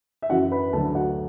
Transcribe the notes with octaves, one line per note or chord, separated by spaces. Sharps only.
E5
F#2 E3 F#4 F#5
B4 B5
D2 D3 F#3 A4 A5
F#4 F#5